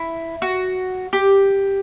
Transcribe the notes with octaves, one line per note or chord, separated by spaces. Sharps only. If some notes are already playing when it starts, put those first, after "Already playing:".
Already playing: E4
F#4
G4